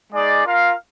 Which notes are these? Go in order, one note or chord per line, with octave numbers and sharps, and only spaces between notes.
G#3 D#4 G#4 D5
F4 A#4 F5